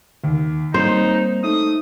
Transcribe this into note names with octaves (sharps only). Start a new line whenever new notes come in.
D#2
G3 A#3 C4 D#4 C5 C#5
A3 D#4 D#6